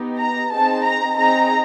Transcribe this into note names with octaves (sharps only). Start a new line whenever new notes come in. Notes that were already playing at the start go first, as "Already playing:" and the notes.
Already playing: B3 D#4 G4
A#5
C4 D#4 G#4 A5
A#5
C4 D#4 G#4 A#5